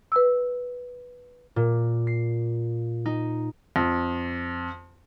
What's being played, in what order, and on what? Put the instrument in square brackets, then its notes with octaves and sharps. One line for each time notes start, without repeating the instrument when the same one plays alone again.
[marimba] B4 E6
[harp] A#2
C7
D#4
[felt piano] F2